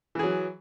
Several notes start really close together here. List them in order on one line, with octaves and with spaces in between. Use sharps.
E3 G#4 F#3